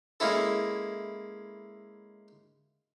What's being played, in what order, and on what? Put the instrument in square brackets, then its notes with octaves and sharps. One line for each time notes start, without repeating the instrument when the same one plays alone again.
[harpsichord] G#3 A#3 C#4 E4 A4